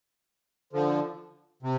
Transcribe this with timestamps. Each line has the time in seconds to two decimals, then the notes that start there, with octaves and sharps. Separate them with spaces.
0.73 D3 F3
1.63 C3